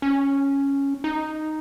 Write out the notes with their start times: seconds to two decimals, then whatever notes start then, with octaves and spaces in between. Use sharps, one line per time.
0.02 C#4
1.04 D#4